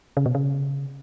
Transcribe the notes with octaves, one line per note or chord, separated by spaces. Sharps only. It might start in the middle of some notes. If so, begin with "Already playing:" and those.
C#3
B2
C#3